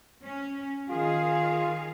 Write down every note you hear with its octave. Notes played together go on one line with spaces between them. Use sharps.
C#4
D#3 F4 G#4 F5